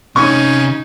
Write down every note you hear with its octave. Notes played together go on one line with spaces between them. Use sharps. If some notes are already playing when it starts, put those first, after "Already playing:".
C3 C#4 D#4 C#5 C#6